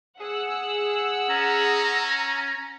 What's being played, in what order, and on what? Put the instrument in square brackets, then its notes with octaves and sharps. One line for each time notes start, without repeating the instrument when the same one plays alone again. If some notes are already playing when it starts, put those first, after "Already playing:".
[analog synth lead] G#4 [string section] F#5 E6
[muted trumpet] C#4 [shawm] A#5